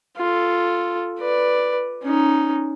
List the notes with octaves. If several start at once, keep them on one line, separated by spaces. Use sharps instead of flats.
F4 A4
B4 D5
C#4 D#4